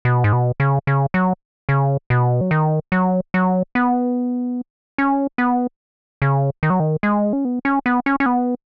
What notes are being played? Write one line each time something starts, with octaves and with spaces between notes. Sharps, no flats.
B2
G#2
B2
C#3
C#3
F#3
C#3
B2
F#3
D#3
F#3
F#3
B3
C#4
B3
C#3
D#3
F#3
D#3
G#3
C#4
B3
C#4
B3
C#4
C#4
B3